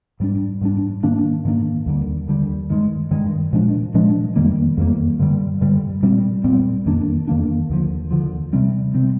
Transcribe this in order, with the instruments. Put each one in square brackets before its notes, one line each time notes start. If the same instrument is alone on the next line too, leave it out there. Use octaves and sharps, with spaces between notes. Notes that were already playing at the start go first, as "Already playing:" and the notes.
[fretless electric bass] G#2 G3 D4
G#2 G3 D4
G#2 D#3 A#3 D4
G#2 D#3 A#3 D4
D#2 D3 G3
D#2 D3 G3
G2 D#3 G#3
G2 D#3 G#3
A#2 F3 G#3 D4
A#2 F3 G#3 D4
F2 D#3 G3 A#3
F2 D#3 G3 A#3
G2 D3 G3
G2 D3 G3
A#2 G3 C4
A#2 G3 C4
F2 D#3 A#3 D4
F2 D#3 A#3 D4
D#2 D3 F3
D#2 D3 F3
C3 G3 C4
C3 G3 C4